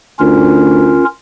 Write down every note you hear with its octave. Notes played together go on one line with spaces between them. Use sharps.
D2 C#4 F4 A#4